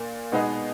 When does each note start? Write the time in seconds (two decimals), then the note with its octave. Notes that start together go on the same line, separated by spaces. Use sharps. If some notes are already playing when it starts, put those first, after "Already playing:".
Already playing: A#2 A#3
0.32 B2 G#3 B3 D#4 G#4